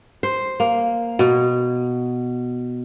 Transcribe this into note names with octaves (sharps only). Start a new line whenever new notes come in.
C5
A#3
B2